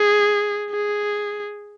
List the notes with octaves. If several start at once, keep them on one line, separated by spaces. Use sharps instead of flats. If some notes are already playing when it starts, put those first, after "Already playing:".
Already playing: G#4
G#4